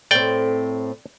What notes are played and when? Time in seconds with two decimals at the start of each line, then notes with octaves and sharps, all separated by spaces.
0.11 A2 C4 D5 G5